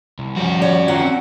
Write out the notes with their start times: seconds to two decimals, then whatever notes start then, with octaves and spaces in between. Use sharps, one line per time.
0.19 C2
0.36 F3 G3 C#4 F#4
0.62 C#5 D5
0.88 D#3 F4 F#5 A#5
1.03 C4